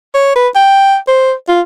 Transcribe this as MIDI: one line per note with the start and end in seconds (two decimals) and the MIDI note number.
0.15 0.33 73
0.36 0.48 71
0.55 0.96 79
1.08 1.33 72
1.48 1.61 65